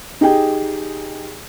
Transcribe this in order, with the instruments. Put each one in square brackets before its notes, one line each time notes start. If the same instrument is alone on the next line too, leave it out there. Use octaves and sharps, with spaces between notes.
[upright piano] D#4 G4 G#4 G5